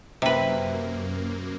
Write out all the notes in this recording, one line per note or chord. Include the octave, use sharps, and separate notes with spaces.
F#2 C3 A#3 B4